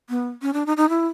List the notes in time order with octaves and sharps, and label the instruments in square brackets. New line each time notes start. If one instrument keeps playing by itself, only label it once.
[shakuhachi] B3
C#4
D4
D#4
D#4
E4